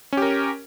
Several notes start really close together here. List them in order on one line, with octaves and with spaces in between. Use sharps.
C#4 G4 A#4